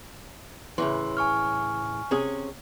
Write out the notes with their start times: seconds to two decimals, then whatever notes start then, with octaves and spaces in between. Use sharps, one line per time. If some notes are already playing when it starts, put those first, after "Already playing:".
0.78 A2 C#3 E3 C6
1.17 G#5 C#6 F6
2.11 C3 C#4 G#4